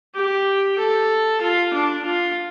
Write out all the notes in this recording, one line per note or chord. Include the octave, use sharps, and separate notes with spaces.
G4
A4
F4
D4
F4